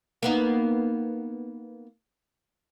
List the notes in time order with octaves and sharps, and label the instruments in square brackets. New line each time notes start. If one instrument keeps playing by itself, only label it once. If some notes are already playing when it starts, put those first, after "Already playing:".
[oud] A#3 B3 D#4